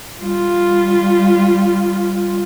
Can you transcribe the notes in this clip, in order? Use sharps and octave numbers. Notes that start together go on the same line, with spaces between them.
G3 F4